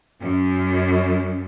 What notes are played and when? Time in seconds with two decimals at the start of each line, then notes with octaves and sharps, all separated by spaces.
0.21 F#2